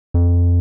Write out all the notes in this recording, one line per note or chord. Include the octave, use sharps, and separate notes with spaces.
F2